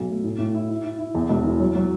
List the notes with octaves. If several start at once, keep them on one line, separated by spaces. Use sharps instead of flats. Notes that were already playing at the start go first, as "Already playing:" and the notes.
Already playing: B1
A3
A2
A2
E4
E4
E4
E4
E2
E1
E3
F#3
F#3